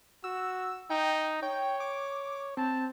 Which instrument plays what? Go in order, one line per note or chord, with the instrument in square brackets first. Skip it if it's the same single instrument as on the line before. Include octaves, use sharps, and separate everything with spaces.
[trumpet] F#4 [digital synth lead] E6
[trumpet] D#4 [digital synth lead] G5
[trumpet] C#5 [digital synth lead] G5
[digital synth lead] D6
[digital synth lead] C4 [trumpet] A5